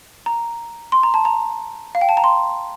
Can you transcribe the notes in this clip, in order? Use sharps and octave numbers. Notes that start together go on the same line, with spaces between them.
A#5
C6
A#5
A5
A#5
F5
G5
A5
A#5
C6